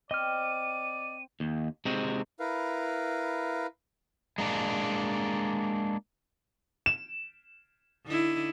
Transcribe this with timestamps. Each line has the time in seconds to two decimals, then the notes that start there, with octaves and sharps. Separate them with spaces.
0.11 C4 D5 D#5 F6 D#7
1.40 D#2
1.85 C3 G#3 C4 D#4 F#4
2.40 E4 A#4 B4 F5
4.38 G#3 A#3 D4
6.86 E7
8.06 D3 D#4 E4